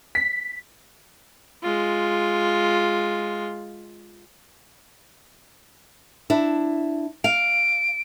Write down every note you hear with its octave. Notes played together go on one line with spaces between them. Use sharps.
B6
G#3 F4
D4 E4
F5 D7